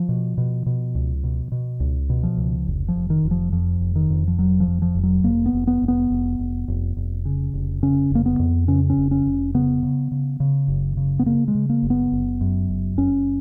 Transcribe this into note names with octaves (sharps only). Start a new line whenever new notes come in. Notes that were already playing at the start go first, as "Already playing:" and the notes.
Already playing: F3
B2
B2
B2
C#2
B2
B2
C#2
B2
F3
C#2
F1
F3
F1
D#3
F1
F3
F2 F3
F1
D#3
F2
F3
F1 F#3
F3
F2
F3
F1
F#3
F1 A#3
B3
F1
B3
F1
B3
F1
F1
F1
F1
C#3
F1
C#3 C#4
F1
A#3
B3
F2
C#3 C#4
C#4
F1
C#4
F1
C#3 B3
C#3
C#3
C#3
F#1
C#3
B3
C#3 A#3
G#3
C#3
A#3
F#1
B3
F#1
F#2
F#1
F#1 C#4